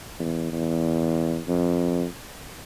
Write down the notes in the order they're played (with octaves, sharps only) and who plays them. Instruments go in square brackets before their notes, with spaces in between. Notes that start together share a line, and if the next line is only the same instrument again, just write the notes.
[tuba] E2
E2
F2